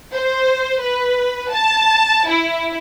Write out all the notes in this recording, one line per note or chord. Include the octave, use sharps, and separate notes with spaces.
C5
B4
A5
E4